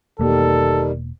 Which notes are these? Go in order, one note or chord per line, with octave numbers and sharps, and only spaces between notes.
E1 B2 D#3 G3 A#3 A4